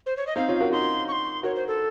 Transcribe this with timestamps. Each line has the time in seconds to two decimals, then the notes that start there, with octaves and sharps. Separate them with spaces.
0.06 C5
0.17 C#5
0.27 D#5
0.36 C4 D#4 F5
0.48 C#4 F4
0.60 F#4 A#4
0.72 D#4 F#4 C6
1.08 C#6
1.12 C6
1.43 F#4 A#4 C#5
1.56 C5
1.68 A4